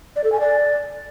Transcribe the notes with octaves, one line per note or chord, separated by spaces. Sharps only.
D5
A4
G#5
D5